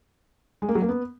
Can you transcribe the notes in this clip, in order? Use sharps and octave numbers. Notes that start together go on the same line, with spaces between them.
G#3
A#3
F#3
A#3
B3